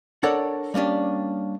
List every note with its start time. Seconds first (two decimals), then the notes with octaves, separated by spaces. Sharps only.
0.23 D4 A4 A#4 C#5 D5 F#5
0.74 G3 A#3 C#4 D4 G4